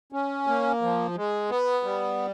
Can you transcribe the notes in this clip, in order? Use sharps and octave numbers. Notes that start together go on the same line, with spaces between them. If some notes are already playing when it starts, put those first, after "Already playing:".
C#4
A#3
F3
G#3
B3
G3